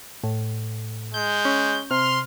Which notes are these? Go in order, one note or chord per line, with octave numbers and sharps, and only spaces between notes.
A2
G#3 G6
C#4
C3 C6 F6